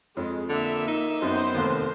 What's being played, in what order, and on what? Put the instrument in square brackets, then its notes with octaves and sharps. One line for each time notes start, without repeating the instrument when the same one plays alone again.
[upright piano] F2 [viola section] G#3
[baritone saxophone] D3 [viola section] A#3 E5
[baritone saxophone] D#4
[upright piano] F#2 [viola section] B3 C4 C5
[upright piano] F1 D#2